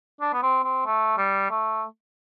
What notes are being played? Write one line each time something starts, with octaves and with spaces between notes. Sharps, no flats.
D4
B3
C4
C4
A3
G3
A3